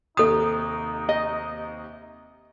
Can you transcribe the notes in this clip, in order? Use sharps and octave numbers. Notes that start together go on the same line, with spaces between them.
D#2 C3 D#4 A4 D#6
D#5